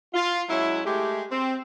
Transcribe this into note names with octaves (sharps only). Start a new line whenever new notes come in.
F4
F#3 G#3 C#4 E4
G#3 A3 G4
C4